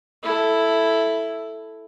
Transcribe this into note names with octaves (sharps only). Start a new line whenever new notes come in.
E4 A4